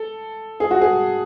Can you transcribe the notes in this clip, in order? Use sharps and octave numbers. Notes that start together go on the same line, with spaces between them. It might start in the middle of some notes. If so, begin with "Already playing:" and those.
Already playing: A4
G#4
F#4
G#4